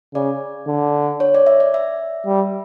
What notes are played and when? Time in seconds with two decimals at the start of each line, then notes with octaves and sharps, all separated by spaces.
0.14 C#3 D5
0.67 D3
1.20 C#5
1.35 D5
1.47 E5
1.60 D5
1.74 E5
2.26 G3